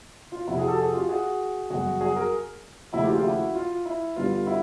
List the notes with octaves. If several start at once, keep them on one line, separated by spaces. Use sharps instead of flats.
F4
F2 C3 F3 E4 F#4
F#4 G#4
G4 A4
F#4 G#4
F4 G4
F#4 G#4
G1 F#2 C#3 F#4 G#4
F#4 G#4
G#4 A#4
D#2 C#3 F3 A3 E4 F#4
F4 G4
F4 G4
E4 F#4
F4
E4
G2 D3 G3 B3 F4
E4 F#4